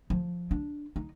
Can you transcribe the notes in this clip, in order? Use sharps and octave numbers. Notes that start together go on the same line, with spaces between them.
F3
D4
D#4